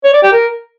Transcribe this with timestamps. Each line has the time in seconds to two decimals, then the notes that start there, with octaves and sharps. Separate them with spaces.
0.04 C#5
0.13 D5
0.23 G4
0.33 A#4